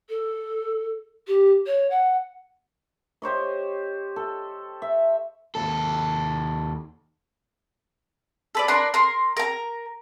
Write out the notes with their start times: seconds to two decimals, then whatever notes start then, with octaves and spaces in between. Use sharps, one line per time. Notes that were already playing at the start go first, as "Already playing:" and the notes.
0.09 A4
1.27 G4
1.66 C#5
1.90 F#5
3.22 G4 C5 C#5 D#5
4.16 A4
4.82 E5
5.55 D#2 A4
8.55 A4 B4 D5
8.68 D4 A#4 B4 C6
8.94 A#4 C6
9.37 A#4 A#5